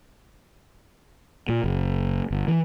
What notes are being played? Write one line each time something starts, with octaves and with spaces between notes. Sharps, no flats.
A#2
F#1
G1
E3